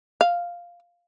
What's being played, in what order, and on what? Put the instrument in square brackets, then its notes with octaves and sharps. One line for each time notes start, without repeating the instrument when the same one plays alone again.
[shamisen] F5